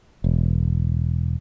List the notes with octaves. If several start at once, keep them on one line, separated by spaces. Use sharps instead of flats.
E1